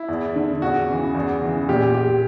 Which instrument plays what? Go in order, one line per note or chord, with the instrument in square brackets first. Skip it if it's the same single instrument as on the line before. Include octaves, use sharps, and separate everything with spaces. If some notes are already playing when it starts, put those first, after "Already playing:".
Already playing: [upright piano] E4
E2
D3
E2 F#4
C#3 E3
E2
C#3 E3
A#2 G4
G4